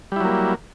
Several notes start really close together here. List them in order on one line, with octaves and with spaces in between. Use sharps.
G3 E4 F#3 A#3